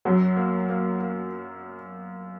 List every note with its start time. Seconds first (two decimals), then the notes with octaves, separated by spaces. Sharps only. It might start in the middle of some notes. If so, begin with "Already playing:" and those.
0.05 F#2 F#3
0.37 A#3
0.69 A#3
1.01 A#3